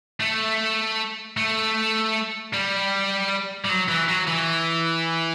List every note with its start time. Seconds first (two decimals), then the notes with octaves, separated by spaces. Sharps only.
0.20 A3
1.37 A3
2.53 G3
3.65 G3
3.69 F#3
3.89 E3
4.09 F#3
4.28 E3